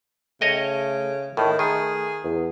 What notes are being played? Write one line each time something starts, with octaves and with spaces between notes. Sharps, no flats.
C#3 A3 C#5 D#5 G5
A2 D#3 A3
D#3 G#4
E2